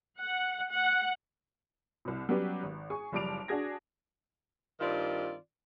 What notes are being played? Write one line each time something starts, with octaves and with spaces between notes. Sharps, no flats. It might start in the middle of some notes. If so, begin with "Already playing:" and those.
F#5
F#5
C2 C3
F#3 G3 B3 C#4 G4 B4
G#1
G#4 G#5 C#6
F#1 F3 G3 D6 D7 F7
D4 F#4 G#4 G#6 A#6
G2 D#3 C4 F4 D5